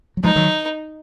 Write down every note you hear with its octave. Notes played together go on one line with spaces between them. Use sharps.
F#3
F3 G#3 D#4
D#3 F#3